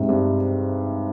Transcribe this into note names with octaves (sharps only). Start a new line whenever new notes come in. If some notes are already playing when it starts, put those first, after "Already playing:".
Already playing: G#2 C3
G2